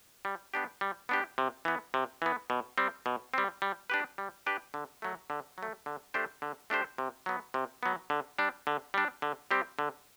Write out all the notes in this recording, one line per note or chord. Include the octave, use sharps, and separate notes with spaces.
G3
B3 D4 G4
G3
B3 D4 G4
C3
E3 B3
C3
E3 B3
B2
G3 C4
B2
G3 C4
G3
D4 G4 B4
G3
D4 G4 B4
D3
F#3 A3
D3
F#3 A3
D3
A3 D4 G4 C5
D3
A3 D4 G4 C5
C3
F#3 B3
C3
F#3 B3
D3
G3 D4
D3
G3 D4
D3
G3 C4 G4
D3